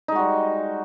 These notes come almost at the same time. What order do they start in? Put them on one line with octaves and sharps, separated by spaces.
D#4 G#3 F#4 G3